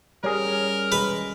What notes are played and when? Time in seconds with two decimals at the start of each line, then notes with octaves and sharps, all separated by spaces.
0.24 G3 C#4 G#4 A#4
0.92 G#3 B4